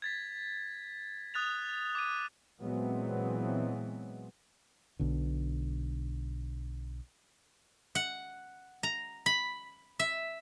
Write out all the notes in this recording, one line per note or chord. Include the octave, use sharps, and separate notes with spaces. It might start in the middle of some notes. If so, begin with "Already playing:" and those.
G#6 A6 B6
D#6 F#6 A6 F7
D6 G#6 D#7
A#2 E3 F#3 G#3 B3 C4
B1 B2 D3
F#5
A#5
B5
E5